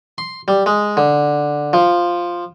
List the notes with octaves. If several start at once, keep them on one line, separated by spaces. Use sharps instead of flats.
C6
G3
G#3
D3
F3